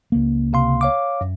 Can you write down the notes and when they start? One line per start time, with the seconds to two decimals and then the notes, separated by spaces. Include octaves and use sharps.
0.12 C#2 A#3
0.53 C3 F5 C6
0.81 C#5 F5 D6
1.21 F#2